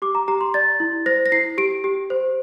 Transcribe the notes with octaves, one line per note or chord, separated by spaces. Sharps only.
G4 D6
A#5
G4 A#5
C6
D5 A6
E4
C5 A#6
A#6
E4 C7
G4 D7
G4
C5